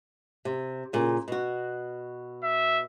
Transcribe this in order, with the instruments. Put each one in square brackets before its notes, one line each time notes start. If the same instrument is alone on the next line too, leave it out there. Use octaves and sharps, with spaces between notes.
[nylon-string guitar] C3
A#2 C#3
B2 F#4
[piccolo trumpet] E5